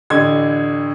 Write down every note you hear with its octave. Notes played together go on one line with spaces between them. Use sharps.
A1 D3 G#6